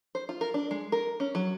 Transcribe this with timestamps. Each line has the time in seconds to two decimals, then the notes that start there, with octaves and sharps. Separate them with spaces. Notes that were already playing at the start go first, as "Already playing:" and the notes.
0.15 C5
0.29 F4
0.41 A#4
0.54 D4
0.71 G#3
0.92 A#4
1.20 C#4
1.35 F#3